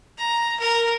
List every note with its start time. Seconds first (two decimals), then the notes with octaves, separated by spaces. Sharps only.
0.18 A#5
0.60 A#4